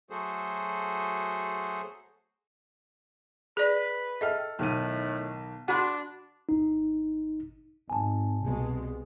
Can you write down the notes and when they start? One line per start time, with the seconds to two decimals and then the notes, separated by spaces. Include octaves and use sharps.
0.10 F#3 A3 F#4 G#4 A4 C5
3.57 G#4 B4 D5
4.21 A4 D#5 E5 G5 F6
4.59 B1 A2 D#3 D#7
5.68 D4 F#4 F#5 B5 C6
6.49 G#1 D#4
7.90 G#1 G#5 A5
8.45 C2 B2 G#3